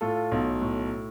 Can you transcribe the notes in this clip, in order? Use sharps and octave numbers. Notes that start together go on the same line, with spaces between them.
A2 F4 A4
B1
A2